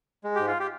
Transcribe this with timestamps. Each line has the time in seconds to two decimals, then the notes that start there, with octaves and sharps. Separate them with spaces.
0.24 G#3
0.35 G#2 G4
0.47 F4
0.60 G4